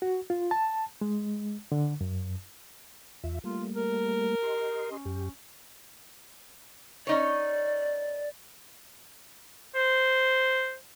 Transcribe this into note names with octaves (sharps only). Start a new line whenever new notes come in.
F#4
F4
A5
G#3
D3
F#2
E2 F4 E5
G3 A3 A#3 F4
A#4
G4 D#5 C6
C#4
F#2 G4
C#4 D#4 C#5 D5
C5